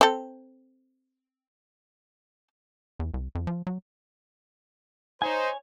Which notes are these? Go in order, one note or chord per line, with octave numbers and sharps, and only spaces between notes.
C4 A4
E2
C2
F2
F3
F#3
D#4 C5 C#5 G#5